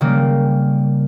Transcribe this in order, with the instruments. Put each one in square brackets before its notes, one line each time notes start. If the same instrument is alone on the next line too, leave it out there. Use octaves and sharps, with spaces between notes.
[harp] C#3 G3 A#3